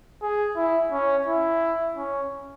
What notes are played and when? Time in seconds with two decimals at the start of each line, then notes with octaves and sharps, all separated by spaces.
0.22 G#4
0.56 E4
0.92 C#4
1.27 E4
1.97 C#4